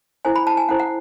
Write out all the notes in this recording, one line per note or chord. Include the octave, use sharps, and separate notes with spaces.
C#4 E4 A4 C5 G#5
B5
A5
G#5
C#4 E4 A4 C5 F#5
F#5